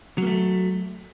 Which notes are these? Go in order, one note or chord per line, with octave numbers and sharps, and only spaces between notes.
F#3 A3 A#3